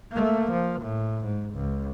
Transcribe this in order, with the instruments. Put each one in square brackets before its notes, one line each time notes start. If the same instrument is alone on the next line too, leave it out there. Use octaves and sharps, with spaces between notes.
[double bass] A3 A#3
F3
A2
G#2
C#2